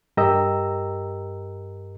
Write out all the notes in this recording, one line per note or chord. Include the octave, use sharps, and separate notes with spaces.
G2 G4 A#4 D#5 A#5 E6